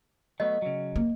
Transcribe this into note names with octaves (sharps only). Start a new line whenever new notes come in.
F#3 A3 B3 D#5
C#3 F#3
A#3